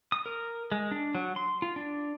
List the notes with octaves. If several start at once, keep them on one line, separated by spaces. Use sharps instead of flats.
D#6
A#4
G#3
D4
F#3
C6
F4
D4